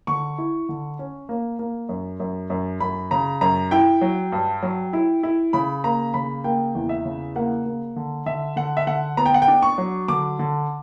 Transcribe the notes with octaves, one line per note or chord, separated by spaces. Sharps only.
D3 C#6
E4
D3
C#4
A#3
A#3
F#2
F#2
F#2
F#2 B5
C#3 A#5
F#2 A#5
E4 G5
F#3
G2
F#3
E4
E4
C#3 B5
A#3 A#5
C#3 B5
A#3 G5
E2
E5
C#3
A#3 F#5
A#3
D3
D3 E5
D3 F#5
E5
D3 F#5
B3 A#5
G5
F#5
G5
D4
C#6
F#3
D3 D6
D3